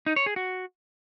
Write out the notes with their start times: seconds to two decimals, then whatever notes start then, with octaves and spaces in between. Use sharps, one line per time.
0.06 D#4
0.16 C#5
0.26 G#4
0.36 F#4